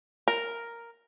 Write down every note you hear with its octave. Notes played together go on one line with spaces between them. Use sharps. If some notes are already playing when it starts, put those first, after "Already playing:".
A#4